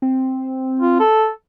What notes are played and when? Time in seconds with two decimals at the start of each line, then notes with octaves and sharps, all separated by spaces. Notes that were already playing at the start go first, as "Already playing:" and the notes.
0.02 C4
0.80 F4
0.99 A4